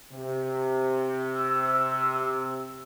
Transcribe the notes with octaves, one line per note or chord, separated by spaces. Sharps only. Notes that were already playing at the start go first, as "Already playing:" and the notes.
C3
E6